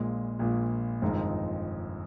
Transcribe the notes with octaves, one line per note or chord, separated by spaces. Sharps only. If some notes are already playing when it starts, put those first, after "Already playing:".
Already playing: A#1 A#2 G#3
A#1 A#2 G#3
G1 F2 D#3 G#3 D#4